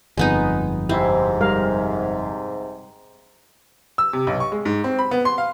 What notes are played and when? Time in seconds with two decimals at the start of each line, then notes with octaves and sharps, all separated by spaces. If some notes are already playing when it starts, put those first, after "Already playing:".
0.17 G1 F2 G#3 B3 D#4
0.89 G#2 C3 C4 E4
1.41 G3 A#4 F5
3.98 E6
4.13 C3
4.27 B1
4.40 C#6
4.52 G#3
4.65 G#2
4.84 C4
4.99 B5
5.11 B3
5.25 C6
5.38 F5